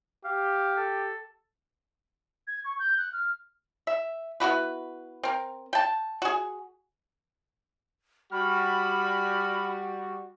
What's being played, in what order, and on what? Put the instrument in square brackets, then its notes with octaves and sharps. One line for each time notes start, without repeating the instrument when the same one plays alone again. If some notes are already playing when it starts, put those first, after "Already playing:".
[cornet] G4 [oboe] F5
[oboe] A4
[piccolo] G#6
C#6
G6
F#6
F6
[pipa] E5
B3 E4 F#4 B4
C4 A#4
G5 A5
F#4 G#4
[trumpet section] G3 F#4 [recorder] B5 [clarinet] F6